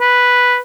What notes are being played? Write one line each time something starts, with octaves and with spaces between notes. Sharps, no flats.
B4